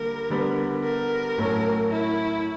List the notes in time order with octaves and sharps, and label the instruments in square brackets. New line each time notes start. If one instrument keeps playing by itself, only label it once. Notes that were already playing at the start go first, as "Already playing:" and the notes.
Already playing: [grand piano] D3 G3 A#3 [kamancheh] A#4
[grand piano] D3 G3 B3
[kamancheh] A#4
[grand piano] A2 F#3 A3 C#4
[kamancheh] E4